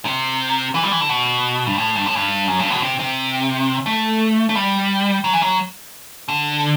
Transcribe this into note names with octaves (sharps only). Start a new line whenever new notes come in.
C3
E3
G3
E3
D3
B2
G2
A2
G2
A2
G2
F#2
G2
B2
C3
C3
A3
A3
G3
F#3
E3
F#3
D3